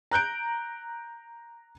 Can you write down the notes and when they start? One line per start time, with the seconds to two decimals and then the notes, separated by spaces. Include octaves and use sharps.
0.11 A#5 F#6 G6 D7